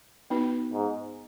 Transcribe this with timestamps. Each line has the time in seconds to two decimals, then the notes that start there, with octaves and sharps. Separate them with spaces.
0.30 B3 D#4 F#4 B4
0.73 G#2